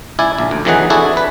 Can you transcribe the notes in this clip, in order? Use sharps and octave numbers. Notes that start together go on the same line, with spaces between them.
C#2 E4 D5 G#5
A#1
D2
F2 D#3 E3 F#3 G#4 F#5
D4 E4 F#4 G#4 A4
B4